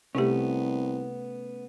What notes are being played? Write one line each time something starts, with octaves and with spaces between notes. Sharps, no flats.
C2 C3 A3 B3 C#4 G4